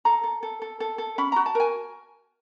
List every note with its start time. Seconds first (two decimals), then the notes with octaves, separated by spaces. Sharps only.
0.05 A4 A#5
0.24 A4
0.43 A4
0.62 A4
0.80 A4
0.98 A4
1.18 C#4 B5
1.32 F#4 A#5
1.46 A5
1.55 A#4 G#5